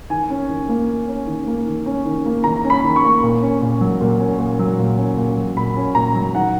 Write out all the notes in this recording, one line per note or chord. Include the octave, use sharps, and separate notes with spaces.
D#3 G#5
C#4
D#3
A#3
D#3
C#4
D#3
A#3
D#3
C#4
D#3
A#3
D#3 A#5
C#4
B5
D#3
C#6
A#3
A#2
C#4
A#2
F#3
A#2
C#4
A#2
F#3
A#2
C#4
A#2
F#3
A#2 B5
C#4
A#2 A#5
F#3
D#3 F#5